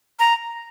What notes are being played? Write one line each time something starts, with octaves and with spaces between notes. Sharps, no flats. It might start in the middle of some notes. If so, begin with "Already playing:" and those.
A#5